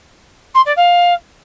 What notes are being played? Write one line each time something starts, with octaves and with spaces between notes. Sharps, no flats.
C6
D5
F5